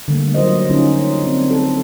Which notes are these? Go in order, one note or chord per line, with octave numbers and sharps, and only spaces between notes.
D3 G3 A3 A#3
F#3 F4 A#4 C5 D#5
D3 C#4 D#4 F4
C4 D4
A4